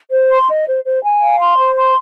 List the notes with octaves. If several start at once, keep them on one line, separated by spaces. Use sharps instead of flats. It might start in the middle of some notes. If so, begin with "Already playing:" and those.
C5
C6
D#5
C5
C5
G#5
F5
C6
C5
C6